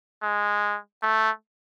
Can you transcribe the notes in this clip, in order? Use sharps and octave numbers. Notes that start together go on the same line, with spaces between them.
G#3
A3